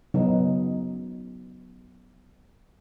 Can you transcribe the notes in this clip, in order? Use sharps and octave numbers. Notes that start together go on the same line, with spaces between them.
C#3 F#3 B3 D#4